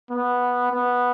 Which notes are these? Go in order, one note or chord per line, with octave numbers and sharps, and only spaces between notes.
B3
B3